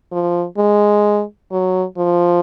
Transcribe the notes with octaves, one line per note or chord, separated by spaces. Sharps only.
F3
G#3
F#3
F3